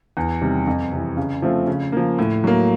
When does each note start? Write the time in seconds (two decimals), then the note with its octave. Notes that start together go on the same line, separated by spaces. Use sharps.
0.17 E2
0.41 C3 D#3 G3
0.67 F2
0.92 C3 E3
1.17 C#3
1.42 F3 A3 C4 F4
1.67 C#3
1.92 F3 A#3
2.19 A2
2.44 F#3 A#3